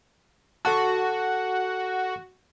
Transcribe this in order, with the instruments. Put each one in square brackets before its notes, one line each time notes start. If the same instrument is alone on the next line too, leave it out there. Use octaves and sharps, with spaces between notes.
[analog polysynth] F#4 [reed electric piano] A4 F#5 A5